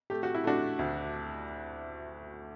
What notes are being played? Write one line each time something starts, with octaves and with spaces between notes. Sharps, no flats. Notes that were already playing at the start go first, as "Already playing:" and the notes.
A3 G4
F#4
E4
A3 D4 F#4
D2